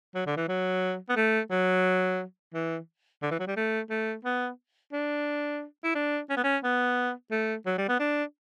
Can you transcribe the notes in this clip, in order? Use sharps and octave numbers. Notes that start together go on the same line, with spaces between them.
F#3
D3
E3
F#3
B3
A3
F#3
E3
D3
E3
F#3
G3
A3
A3
B3
D4
E4
D4
C#4
B3
C#4
B3
A3
F#3
G3
B3
D4